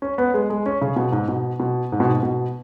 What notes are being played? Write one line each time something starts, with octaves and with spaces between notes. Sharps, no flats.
C#4
B3
G#3
G#3
C#4
C#3
B2
G#2
B2
B2
G#2
B2
G#2
B2